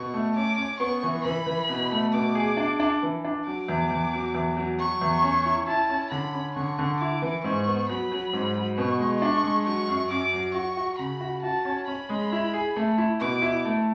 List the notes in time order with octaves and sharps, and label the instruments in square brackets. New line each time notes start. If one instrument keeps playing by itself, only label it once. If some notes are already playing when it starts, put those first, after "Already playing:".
Already playing: [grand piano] B2 [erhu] C#6
[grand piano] A3
[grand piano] C#4 [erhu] D6
[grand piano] C#4
[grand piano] B3 [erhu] C#6
[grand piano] E3
[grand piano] E3 [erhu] B5
[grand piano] E3
B2
A3
[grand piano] B2 [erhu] D6
[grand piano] G#4
D4
D4
E3
D4
[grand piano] F#3 [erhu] D6
[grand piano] E2
E2
F#3
E2
F#3
[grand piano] F#3 [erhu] C#6
[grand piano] E2
C#4
E4
[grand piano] E4 [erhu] A5
[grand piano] C#4
[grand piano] D3 [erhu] B5
[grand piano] C#4
[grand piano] D3 [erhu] C#6
[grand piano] D3
[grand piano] E4 [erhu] D6
[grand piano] E3
[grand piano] G#2 [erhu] C#6
[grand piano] B3
[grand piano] F#3 [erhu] B5
[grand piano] F#3
G#2
F#3
[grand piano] B2 [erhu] C#6
[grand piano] G#3
[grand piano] D4 [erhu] C#6
[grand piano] G#3
[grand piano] F#3 [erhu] C#6
[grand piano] F#2
[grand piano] F#2 [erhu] D6
[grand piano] F#3
[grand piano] F#4 [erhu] C#6
[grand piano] F#4
[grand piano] C#3 [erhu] B5
[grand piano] F#4
[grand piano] F#4 [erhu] A5
[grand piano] C#4
[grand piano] C#4 [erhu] B5
[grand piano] G#3
E4
G#4
A3
E4
[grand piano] B2 [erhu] D6
[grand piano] E4
A3